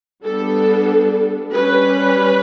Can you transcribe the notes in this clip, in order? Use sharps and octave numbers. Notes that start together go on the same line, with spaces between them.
G3 B3 D4 A4
G3 C#4 B4